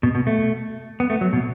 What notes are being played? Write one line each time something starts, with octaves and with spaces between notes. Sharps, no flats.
B2
B2
A3
B3
A3
F#3
B2